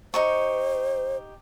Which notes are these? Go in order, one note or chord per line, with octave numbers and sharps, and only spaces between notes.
D#4 G4 C5 C#6